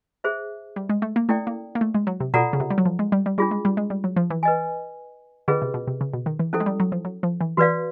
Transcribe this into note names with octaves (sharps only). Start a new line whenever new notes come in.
G#4 C5 E5
G3
G#3
A3
A#3
A3 C#4 E4 A4 D5 G5
A#3
A#3
A3
G#3
F#3
C3
B2 F4 A4 D5 F#5 A#5
C#3
C3
G3
F#3
F3
G#3
G3
G3
G3 D4 F4 G#4
G#3
G3
G#3
G3
F#3
F3
E3
B4 D#5 G#5
D3 C#4 F4 G#4 B4 D#5
C3
B2
C3
C#3
B2
D#3
E3
F3 C#4 E4 A4
G#3
G3
F#3
F3
F#3
F3
E3
E3 F#4 B4 D5 F5